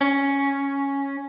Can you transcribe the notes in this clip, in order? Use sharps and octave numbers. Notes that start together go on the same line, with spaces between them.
C#4